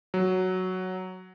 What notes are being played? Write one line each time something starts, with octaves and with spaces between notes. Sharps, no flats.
F#3